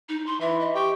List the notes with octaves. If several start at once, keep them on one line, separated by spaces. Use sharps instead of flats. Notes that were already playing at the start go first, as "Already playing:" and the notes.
D#4
C6
E3 E5
D#5
G4 C#6